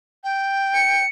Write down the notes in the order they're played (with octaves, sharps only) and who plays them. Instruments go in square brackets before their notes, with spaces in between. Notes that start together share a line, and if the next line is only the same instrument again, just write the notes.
[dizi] G5
[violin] C#7